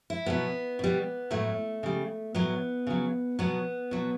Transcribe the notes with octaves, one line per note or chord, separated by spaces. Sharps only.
E4
B2 F#3 B3
B2 G3
A2 F#3 A3
C#3 G3
A2 F#3 B3
C#3 F#3
B2 F#3 B3
B2 F#3